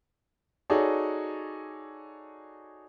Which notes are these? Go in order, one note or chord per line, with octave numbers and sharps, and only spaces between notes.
D#4 F#4 G#4 A4 C#5 D5